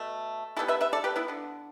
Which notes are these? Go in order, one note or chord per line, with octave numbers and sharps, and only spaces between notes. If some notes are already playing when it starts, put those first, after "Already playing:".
Already playing: B2 A3
E3 G3 B3 E4 A4
B4 E5
B4 E5
A4 D5
G4 B4
B3 E4
D3 B3